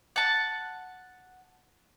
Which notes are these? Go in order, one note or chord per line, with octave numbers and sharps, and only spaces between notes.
F#5 A5